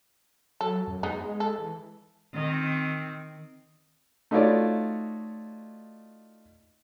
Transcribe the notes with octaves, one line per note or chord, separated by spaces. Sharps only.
F#3 A4
F#2
G#3 B3 D#4
A4
E3
D#3 C4
A3 D#4 F4 F#4 C#5 D5